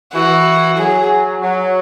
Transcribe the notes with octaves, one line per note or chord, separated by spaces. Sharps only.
E3 F#4
F#3 G#4
F#3